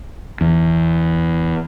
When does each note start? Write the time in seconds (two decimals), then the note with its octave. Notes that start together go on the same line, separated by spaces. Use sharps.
0.41 E2